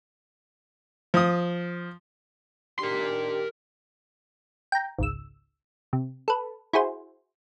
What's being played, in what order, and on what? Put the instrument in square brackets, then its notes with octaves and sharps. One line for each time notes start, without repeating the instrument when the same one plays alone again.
[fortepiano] F3 D#6
[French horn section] D#3 D4 G4 [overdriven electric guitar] A#4 C6
[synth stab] G5 A#5
G#1 C#2 E6
C3
A4 B4
E4 F#4 G#4 C5